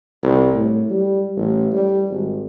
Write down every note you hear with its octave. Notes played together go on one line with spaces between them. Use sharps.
C2
A2
G3
A1
G3
G#1